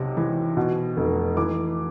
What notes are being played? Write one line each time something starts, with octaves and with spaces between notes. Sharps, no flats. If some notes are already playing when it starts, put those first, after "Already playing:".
Already playing: B1 C3
E3
B2
F1
E3 D6